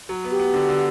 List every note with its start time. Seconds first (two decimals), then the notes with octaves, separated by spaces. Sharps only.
0.09 F#3
0.24 B3
0.31 G4
0.40 B3
0.54 D3
0.69 D3